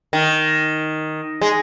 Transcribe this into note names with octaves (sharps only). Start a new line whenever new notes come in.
D#3
G#3